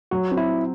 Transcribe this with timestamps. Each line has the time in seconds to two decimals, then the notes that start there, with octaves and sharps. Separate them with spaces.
0.11 F#3 F#4
0.31 C4
0.37 E4